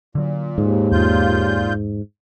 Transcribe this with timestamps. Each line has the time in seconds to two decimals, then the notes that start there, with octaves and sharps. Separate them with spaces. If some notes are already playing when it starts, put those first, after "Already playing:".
0.15 A#2 D3 F#3
0.58 D#2 G#2
0.92 E1 E2 A#2 F4 G6